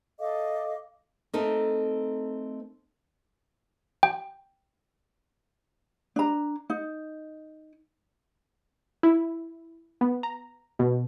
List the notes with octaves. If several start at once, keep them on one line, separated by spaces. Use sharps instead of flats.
A4 D#5 F5 D6
A3 C4 D#4 A4 A#4
G5
D4 A#5
D#4
E4
B3
A#5
B2